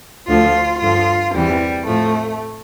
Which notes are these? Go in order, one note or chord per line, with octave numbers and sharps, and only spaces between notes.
D2 D3 F3 F4
G2 D3 F3 F4
E2 C3 E3 G3
A2 F3 A3